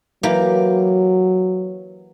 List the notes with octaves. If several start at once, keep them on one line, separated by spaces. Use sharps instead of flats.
E3 F#3 A#3 G4